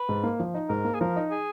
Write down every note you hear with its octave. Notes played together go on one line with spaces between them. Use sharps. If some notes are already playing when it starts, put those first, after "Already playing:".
Already playing: B4
G#2
A#3
F3
D#4
G#2 A#4
A#3
G#4
F3 A#4
D#4
G#4